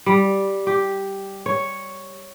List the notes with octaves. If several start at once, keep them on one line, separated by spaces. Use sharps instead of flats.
G3
G4
C#5